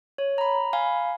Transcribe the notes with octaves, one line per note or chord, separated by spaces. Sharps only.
C#5
A#5 B5
F5 G#5 B5